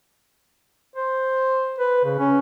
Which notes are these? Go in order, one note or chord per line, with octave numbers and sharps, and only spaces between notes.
C5
B4
C#3
C#4